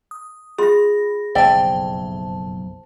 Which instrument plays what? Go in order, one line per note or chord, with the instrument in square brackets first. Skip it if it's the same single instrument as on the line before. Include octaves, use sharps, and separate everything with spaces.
[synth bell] D#6
[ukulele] F4 [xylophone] G#4 [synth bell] B5 A#6
[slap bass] F#1 B1 F2 [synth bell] C5 A5 [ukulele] D5 E5 G5